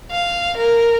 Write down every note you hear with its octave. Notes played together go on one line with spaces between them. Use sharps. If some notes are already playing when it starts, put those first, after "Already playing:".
F5
A#4